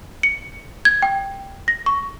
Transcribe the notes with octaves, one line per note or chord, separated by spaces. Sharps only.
C#7
G#6
G5
A#6
C#6